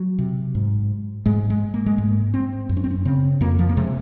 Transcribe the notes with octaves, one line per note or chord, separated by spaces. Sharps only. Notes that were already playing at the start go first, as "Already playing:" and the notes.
Already playing: F#3
C3
G#2
G#2 G#3
G#3
A#3
G#3
G#2 A#3
C4
F#2
C#4
C4
C#4
C#3 C4
F2 A#3
F3
A#3
C3 G#3